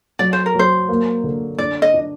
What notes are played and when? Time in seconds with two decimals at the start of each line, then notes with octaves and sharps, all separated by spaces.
0.19 F#3 D5
0.33 C5
0.46 A#4
0.55 F#3 C5
0.89 A#3
1.24 D3
1.58 D4 D5
1.82 D#5
1.94 D4